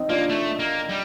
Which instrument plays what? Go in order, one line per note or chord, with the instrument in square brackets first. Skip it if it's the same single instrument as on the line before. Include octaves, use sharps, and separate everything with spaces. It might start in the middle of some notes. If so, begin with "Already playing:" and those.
Already playing: [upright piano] C4 D#4
[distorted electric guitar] A#3 [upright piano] D4 F4
[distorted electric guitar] A3
A#3
G3